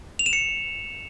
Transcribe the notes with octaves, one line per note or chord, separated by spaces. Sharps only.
F7
E7
C#7